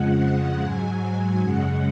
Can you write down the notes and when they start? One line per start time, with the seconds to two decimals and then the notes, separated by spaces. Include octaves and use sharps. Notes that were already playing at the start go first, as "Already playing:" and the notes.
Already playing: F2 C#3 F3 G#3 F#5
0.61 G#2 F#3 G#5
1.42 F#2 C#3 G#3 F#5